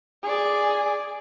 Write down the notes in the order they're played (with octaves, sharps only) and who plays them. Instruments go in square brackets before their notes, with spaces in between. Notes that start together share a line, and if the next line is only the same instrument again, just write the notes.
[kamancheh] G#4 D5